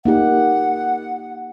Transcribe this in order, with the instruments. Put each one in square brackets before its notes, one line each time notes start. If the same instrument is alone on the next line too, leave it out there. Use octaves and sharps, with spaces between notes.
[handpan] A#3 D#4 G4 [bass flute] F#5